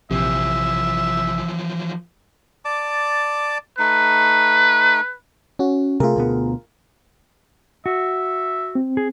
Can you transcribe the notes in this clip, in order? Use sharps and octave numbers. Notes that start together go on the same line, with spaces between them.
A#1 C3 E3 F3 E5
D5 A5 D6
A3 D#4 B4
C#4 F#4
C3 A3 F4 G#4 A#4
D2 B2 B3
F#4 E5
C4
G#4